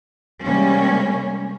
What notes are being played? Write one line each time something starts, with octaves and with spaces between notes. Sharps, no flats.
C3 G3 G#3 A#3 C#4